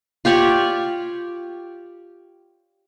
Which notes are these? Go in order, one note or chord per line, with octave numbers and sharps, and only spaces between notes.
F4 G4 C#5 D5